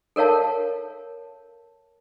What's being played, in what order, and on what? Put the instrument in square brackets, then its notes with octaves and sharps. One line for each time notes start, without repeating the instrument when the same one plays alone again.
[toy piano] A4 A#4 C#5 F5 A5